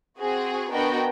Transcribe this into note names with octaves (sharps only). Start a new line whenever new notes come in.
C4 F#4 G#4
B3 D4 F#4 A#4 D#5 G5